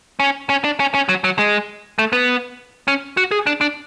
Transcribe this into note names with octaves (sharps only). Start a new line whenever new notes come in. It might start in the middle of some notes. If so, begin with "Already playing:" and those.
C#4
C#4
D4
C#4
C#4
F#3
F#3
G#3
A3
B3
C#4
F#4
G#4
D4
D4